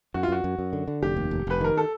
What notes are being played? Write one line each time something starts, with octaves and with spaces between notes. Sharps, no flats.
F#2 F#4
F4
F#2 F#4
F#2
F#2
D3
D3
F1 G4
D#2
F1
F1 B4
D#3 A#4
A4